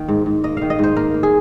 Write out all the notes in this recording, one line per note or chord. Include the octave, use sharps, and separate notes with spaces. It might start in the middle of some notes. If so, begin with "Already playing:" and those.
Already playing: D#3 A#3
G#2
G#2
A#3 D#5
D#3 F5
D#5
G#2 C5
A#3 A#4
A#3
G#4